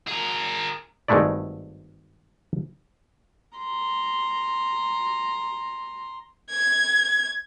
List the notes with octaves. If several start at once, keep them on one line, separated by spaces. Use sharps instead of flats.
G#4 A#4
G#1 G2 G#3 A3 E4 D5
A#5 C6
G#6